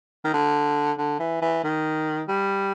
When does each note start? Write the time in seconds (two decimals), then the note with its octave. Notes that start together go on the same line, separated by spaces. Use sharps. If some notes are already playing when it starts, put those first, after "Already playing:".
0.25 D#3
0.34 D3
0.98 D3
1.20 E3
1.42 E3
1.64 D#3
2.28 G3